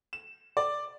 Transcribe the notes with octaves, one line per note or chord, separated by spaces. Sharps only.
E7
D5